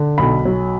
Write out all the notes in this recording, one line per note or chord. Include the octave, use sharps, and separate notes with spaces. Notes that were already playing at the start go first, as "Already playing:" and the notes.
Already playing: D3
B1 B5
F#3